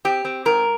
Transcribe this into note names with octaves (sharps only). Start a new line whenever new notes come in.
C4 G4
C4
G#2 A#4